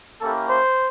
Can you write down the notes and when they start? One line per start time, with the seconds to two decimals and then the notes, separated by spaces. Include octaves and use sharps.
0.20 A#3 C#4 E4 G4 A4
0.49 C5